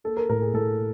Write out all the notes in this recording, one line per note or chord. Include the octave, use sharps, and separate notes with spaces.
A#3 A4
A#4
A2 A#4
G#4
A2 A4